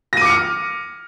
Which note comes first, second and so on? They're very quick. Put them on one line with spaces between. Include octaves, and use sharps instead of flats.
A#6 D#7 D6 C#7 F6